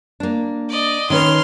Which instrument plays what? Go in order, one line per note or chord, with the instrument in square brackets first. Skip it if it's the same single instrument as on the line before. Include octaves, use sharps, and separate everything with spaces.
[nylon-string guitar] A#3 D4
[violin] D5 D#5
[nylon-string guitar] D#3 C#4 B4 [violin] C6 F6